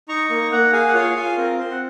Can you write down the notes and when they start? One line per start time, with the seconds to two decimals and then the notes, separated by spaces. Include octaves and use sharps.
0.09 D#4 A#5 C#6
0.30 A#3
0.52 A#3 F#5 A#5
0.73 G#4 F5 G#5
0.88 F#5
0.94 F4 C#5 F5
1.16 F4 F5 G#5
1.37 C4 A#4
1.58 C4 C5
1.71 F#5